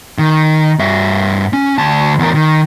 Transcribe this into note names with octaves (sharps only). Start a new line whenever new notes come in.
D#3
G2 E5
C#4
D2 A5
E2 A#4
D#3